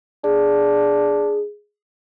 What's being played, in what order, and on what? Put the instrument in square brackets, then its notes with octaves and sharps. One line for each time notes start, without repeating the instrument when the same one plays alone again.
[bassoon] D4 [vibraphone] G#4